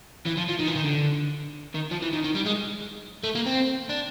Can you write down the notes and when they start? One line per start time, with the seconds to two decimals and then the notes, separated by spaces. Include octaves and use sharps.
0.26 E3
0.37 F3
0.48 F3
0.59 D#3
0.67 E3
0.75 D#3
0.84 D3
1.75 D#3
1.91 F3
2.02 E3
2.13 D#3
2.24 D#3
2.35 G3
2.46 G#3
3.23 A3
3.35 A#3
3.46 C4
3.89 D4